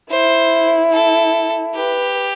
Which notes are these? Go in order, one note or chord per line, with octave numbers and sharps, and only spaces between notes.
E4 C5
A4
G4 B4